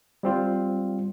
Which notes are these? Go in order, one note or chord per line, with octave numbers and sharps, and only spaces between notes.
G3 C4 F4